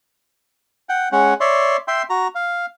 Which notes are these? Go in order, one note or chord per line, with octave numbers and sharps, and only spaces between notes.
F#5 G5
G#3 C#4 F#5
C#5 D5 E5 C6
E5 G5 C6
F#4 A#5
F5